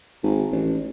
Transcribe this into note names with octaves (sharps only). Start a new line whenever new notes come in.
G#1
A1